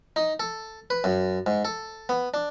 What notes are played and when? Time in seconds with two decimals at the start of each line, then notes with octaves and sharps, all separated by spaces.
0.16 D#4
0.40 A4
0.90 B4
1.04 F#2
1.46 G#2
1.65 A4
2.09 B3
2.34 D4